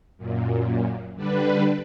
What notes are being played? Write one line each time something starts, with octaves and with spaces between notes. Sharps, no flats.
F#2 A#2
D3 G3 D4 B4